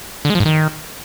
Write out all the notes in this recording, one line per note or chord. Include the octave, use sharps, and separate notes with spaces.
D3
G#3
F3
G#2
D#3